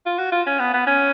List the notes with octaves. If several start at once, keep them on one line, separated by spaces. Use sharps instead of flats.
F4
F#4
F4
C#4
B3
B3
C#4